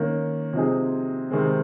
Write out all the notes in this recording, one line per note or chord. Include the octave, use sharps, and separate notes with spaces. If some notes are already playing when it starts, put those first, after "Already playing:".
Already playing: D#3 A#3 C#4
C3 F3 C4 D#4 G#4
C3 D#3 G#3 C4